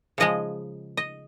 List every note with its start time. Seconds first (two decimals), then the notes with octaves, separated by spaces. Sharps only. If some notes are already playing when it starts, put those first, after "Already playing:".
0.18 C#3 F3 G#3 D#5
0.97 D#5